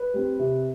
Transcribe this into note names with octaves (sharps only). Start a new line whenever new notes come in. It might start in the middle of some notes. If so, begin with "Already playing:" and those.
Already playing: B4
G3 C4
C3